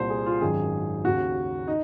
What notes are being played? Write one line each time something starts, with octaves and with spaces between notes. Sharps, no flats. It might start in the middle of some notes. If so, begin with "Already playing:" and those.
Already playing: C2 A#2 C5
G#4
F4
G#1 F#2 D#3 G#4
D#2 C#3 F#4
D#4